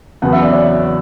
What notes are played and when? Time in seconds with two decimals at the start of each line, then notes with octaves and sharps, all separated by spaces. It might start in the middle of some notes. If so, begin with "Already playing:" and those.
0.22 E2 C#3 F#3 B3 F#5
0.32 E5
0.42 D5
0.52 C#5 E5